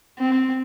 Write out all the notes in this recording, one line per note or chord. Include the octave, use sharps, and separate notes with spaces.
C4